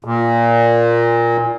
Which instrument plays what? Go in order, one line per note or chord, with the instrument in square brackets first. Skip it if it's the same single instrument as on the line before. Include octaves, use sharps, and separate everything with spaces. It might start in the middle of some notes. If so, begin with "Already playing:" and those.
[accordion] A#2